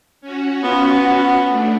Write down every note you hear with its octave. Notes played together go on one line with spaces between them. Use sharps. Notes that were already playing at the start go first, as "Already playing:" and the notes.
C#4 F#4
B3 F4
F#5
A3 D4